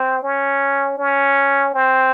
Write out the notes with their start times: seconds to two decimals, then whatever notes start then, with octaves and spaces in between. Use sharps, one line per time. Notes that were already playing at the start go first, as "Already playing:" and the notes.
Already playing: C4
0.23 C#4
0.98 C#4
1.74 C4